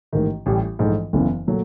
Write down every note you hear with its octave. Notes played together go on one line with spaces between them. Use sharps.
A1 G#2 D#3
A1 A2 E3 G3
A#1 G#2 E3 A3
F#1 E2 C#3 E3
A#2 F#3 A3